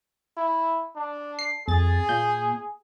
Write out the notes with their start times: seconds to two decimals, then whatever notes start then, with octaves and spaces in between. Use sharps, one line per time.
0.37 E4
0.96 D4
1.39 C7
1.68 F2 G#4 A6
2.09 A#2 G6